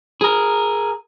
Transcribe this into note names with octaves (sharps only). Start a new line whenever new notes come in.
G#4 A#4